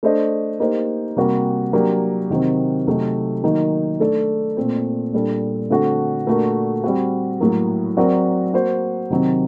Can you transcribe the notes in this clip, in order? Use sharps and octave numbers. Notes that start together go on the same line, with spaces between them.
A3 D4 A4 C5 D#5
A#3 D#4 G4 C5
C3 G3 A#3 F#4
F#3 A#3 D4 G4
C3 D#3 F#3 C4
C3 F#3 A3 D#4
D#3 F#3 A#3 D#4
A3 D4 A4 D5
A#2 A3 C4
A#2 G3 D4 A4
D3 A3 C4 F#4 A4
A#2 A3 D4 F#4 A#4
G3 C4 F#4
A2 F#3 A#3
F#3 C4 F#4 A#4 D5
A#3 F#4 C5
C3 D#3 F#3 C4